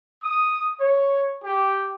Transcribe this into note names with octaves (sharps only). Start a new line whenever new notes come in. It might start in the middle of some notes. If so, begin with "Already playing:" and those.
D#6
C#5
G4